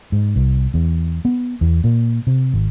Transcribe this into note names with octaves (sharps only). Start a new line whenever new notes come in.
G#2
C2
E2
B3
E2
A#2
C3
G#1